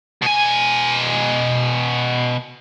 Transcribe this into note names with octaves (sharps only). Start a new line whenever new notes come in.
B2 G#5